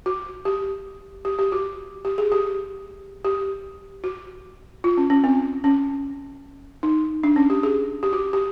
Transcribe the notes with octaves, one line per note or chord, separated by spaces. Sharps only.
F#4
G4
G4
G4
F#4
G4
G#4
G4
G4
F#4
F4
C#4
C#4
C4
C#4
D#4
D4
C#4
G4
G#4
G4
F#4
G4